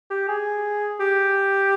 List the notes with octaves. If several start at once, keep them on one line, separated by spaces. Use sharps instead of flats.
G4
G#4
G4